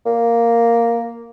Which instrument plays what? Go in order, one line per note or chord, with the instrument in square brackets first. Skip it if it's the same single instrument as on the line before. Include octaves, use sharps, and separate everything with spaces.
[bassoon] A#3